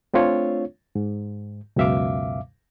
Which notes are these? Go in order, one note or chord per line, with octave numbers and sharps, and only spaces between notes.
A3 C4 D4 F4 C#5
G#2
C#2 F#2 B2 E5 F5 D6